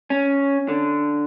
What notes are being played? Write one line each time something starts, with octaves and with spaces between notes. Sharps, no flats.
C#4
D3